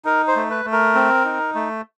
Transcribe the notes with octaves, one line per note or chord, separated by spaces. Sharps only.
D#4 A#4
C5
A3
B4
A3
A#4
C4
D#4
A3